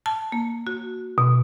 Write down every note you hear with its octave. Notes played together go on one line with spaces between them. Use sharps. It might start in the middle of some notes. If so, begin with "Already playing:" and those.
A5
A#3
F#4
B2